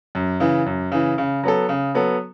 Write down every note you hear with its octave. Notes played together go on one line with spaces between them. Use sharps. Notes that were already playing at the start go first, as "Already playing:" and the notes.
F#2
C#3 E3
F#2
C#3 E3
C#3
F#3 B3 A4
C#3
F#3 B3 A4